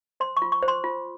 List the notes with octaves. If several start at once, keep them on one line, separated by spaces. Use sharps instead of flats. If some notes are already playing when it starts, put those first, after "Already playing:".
C5 C6
C#6
F4
C#6
C5
C6
F4